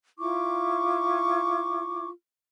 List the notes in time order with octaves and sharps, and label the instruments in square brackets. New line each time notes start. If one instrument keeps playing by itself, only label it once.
[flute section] E4 F4 C#6 D6